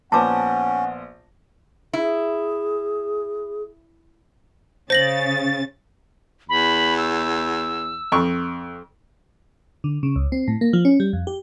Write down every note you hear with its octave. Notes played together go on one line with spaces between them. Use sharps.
A#1 B3 C#4 C5 F#5 A5 D6
E4 G#4
C#3 C5 A6 A#6 F#7
E2 B5
E6
F2 C#6
D3
C#3
C#2
C4
A2
A#3
F3
C#4
G3
F2
G4